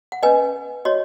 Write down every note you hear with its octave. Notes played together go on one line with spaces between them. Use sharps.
F#5
C#4 B4 D#5 G#5
F#4 C#5 D#5